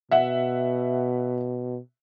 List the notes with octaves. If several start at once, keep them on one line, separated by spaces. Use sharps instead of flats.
B2 E5 F#5